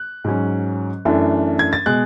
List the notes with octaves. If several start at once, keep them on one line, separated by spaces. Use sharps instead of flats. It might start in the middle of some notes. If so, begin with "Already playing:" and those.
Already playing: F#6
G#2 F#3 C#4
F#2 E3 A3 D4
G#6
A6
B2 G#3 F#6